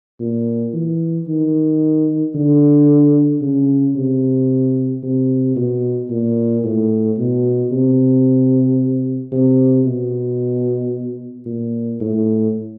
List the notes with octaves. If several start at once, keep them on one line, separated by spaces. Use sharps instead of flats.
A#2
E3
D#3
D3
C#3
C3
C3
B2
A#2
A2
B2
C3
C3
B2
A#2
A2